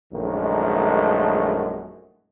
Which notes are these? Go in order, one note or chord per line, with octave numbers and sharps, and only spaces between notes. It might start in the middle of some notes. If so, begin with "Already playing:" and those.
A#1 F#2 D#3 G#3 A3